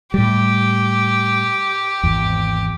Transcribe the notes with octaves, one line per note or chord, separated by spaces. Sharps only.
A2 G3 G4
G#1 E2